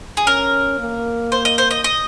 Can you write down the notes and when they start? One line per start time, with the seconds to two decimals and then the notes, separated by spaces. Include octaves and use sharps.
0.17 G#4
0.26 C#4 A#4
0.79 A#3
1.32 C5
1.45 D#5
1.58 C5
1.71 D#5
1.84 D#5